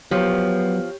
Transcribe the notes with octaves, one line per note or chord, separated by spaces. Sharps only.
F3 F#3 B3 G4 C#5